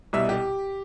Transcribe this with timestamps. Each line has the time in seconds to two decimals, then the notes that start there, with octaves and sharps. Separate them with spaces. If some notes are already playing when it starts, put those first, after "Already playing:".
0.13 C2 B2 G3 E5
0.29 G4